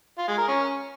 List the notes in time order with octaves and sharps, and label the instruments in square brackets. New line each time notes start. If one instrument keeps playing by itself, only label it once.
[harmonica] F4
G#3
A#4
C#4